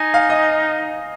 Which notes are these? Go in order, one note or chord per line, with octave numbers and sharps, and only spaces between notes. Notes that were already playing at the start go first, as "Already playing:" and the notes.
Already playing: D#4 G#5
F5
D#5